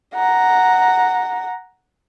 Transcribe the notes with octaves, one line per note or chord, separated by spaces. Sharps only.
F#5 A#5